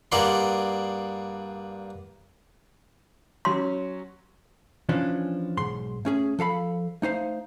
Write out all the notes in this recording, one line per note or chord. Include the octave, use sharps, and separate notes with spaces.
G2 A#3 G#4 D5 F#5 C6
F#3 C#4 C6
E3 F3 C#4 D4
B1 G#2 C6
A3 C#4 G#4
F3 A4 F5 B5
A3 D#4 C5 F5